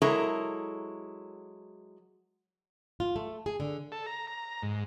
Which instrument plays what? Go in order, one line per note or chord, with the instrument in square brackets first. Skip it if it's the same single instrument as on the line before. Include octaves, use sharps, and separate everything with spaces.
[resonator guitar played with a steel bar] F#3 G#3 E4 A4 A#4 C#5
[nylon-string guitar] F4
A3
G#4
D3
[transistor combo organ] A4
A#5
A#5
G#2